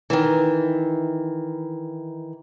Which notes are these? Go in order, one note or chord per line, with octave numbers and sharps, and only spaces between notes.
D#3 E3